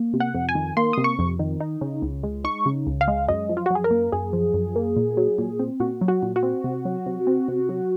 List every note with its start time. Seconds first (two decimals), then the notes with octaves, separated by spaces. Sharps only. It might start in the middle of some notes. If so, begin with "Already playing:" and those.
Already playing: A#3
0.13 C3
0.20 F#5
0.34 F2
0.49 G#5
0.55 D#3
0.77 A#3 C6
0.93 C3 D#6
1.04 C#6
1.19 F2
1.39 D#3
1.60 D#4
1.81 C#3
2.02 C#2
2.23 G#3
2.44 D#4 C#6
2.66 C#3
2.87 C#2
3.01 F5
3.08 G#3
3.28 F#2 D#5
3.49 F3
3.57 F4
3.66 F#4
3.71 F#2 G#4
3.84 A#4
3.91 A#3
4.12 F#2 G#4
4.33 F3
4.54 F#2
4.76 A#3
4.96 A#2
5.17 F#3
5.38 A#2
5.59 C4
5.80 A#2 F#4
6.01 F#3
6.08 F#4
6.23 A#2
6.36 F#4
6.43 C4
6.64 C3
6.85 F#3
7.06 C3
7.27 C4
7.48 C3
7.69 F#3